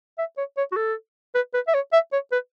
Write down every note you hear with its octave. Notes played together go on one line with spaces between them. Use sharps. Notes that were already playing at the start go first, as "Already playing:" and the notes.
E5
C#5
C#5
F#4
A4
B4
B4
E5
C#5
E5
C#5
B4